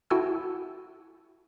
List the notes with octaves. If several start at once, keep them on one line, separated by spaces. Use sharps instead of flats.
E4 F#4 A4 G5 G#5 E6